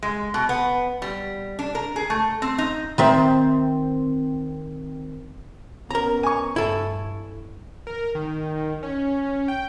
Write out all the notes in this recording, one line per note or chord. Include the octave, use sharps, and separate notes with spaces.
G#3
B2
B3
G3
D4
A#4
G#4
A3
C4
D#4
D#3 C4 E5
B3 C#4 A#4 A#5
G#5 C#6
G2 E4 A4
A#4
D#3
C#4
G5